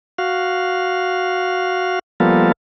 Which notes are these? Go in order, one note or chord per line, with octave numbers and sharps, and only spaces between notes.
F#4 F5
F3 G3 A#3 B3 F4 A4